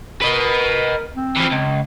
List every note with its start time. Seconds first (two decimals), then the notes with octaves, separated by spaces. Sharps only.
0.22 A#4 B4 D#5
1.16 C4
1.36 E3 F3
1.51 C#2